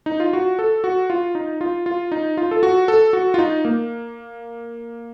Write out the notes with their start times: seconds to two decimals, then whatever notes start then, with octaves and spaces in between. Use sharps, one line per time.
0.06 D#4
0.20 F4
0.33 F#4
0.59 A4
0.84 F#4
1.10 F4
1.35 D#4
1.61 F4
1.86 F4
2.12 D#4
2.37 F4
2.51 A4
2.63 F#4
2.88 A4
3.13 F#4
3.34 F4
3.38 D#4
3.65 A#3